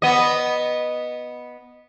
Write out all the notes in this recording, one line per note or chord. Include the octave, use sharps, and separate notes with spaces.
B3 D#5